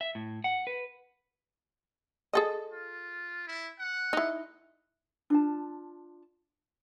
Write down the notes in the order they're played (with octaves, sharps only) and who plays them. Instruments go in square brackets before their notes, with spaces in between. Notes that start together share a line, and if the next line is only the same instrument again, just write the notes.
[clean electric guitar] E5
A2
F#5
B4
[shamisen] G#4 A4 D#5
[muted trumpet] F4
E4
F#5
[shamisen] D#4 E4
[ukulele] D4 F4 A5